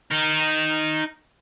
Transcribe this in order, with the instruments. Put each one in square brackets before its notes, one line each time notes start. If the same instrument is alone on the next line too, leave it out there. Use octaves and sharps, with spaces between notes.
[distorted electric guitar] D#4 A#4